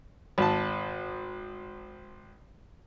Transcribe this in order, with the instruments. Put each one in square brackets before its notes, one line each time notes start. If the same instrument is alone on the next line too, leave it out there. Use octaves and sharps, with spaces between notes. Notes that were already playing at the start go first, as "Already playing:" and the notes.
[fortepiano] G#1 A5